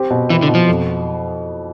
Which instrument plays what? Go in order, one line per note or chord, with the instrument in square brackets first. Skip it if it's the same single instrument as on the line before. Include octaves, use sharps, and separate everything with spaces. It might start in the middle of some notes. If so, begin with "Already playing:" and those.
Already playing: [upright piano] C4 G4
B2
[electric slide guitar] E3 [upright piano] E4
[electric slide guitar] D3
[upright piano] B2
[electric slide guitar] F3
[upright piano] F2